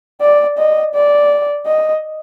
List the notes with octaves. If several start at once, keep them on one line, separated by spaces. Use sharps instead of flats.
D5
D#5
D5
D#5